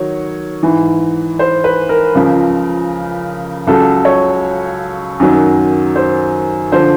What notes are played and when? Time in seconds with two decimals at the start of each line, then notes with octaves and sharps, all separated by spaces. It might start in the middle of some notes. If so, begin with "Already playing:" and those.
Already playing: D#3 F#3 C#5
0.63 G#2 E3
1.39 C5
1.64 B4
1.89 A#4
2.15 C#2 C#3 F3
3.67 C#2 C#3 F#3 A4
4.05 C#5
5.20 F#2 D#3 F#3
5.96 C5
6.72 D3 F3 C5